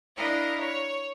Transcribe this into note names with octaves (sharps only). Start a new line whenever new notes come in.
D4 E4 A#4 D#5 F5
C#5